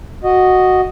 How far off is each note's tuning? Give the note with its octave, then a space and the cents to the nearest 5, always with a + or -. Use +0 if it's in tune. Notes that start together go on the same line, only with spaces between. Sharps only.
F#4 +0 D#5 -5